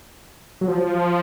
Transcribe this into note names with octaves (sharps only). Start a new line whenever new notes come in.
F#3
F3